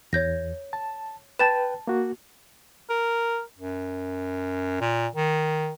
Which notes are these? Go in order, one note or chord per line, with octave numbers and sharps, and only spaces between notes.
E2 C#5 G6 A#6
A5
B4 G5 A5 A6 E7
A#3 F#4
A#4
F#2
A#2
D#3